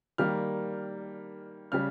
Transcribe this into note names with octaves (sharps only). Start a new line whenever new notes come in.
D#3 G3 A#3 F6
C#3 G3 F6